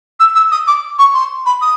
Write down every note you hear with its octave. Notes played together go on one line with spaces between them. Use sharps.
E6
E6
D#6
D6
C#6
C6
B5
D#6